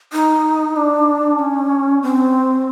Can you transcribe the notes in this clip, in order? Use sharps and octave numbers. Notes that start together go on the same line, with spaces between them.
D#4
D4
C#4
C4